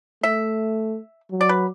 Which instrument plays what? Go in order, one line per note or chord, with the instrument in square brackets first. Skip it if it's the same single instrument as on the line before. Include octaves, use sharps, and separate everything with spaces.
[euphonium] A3 [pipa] E5
[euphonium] F#3
[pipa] D5
B4